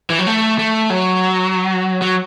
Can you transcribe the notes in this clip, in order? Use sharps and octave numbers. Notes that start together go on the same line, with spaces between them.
E3
F#3
A3
A3
F#3
F#3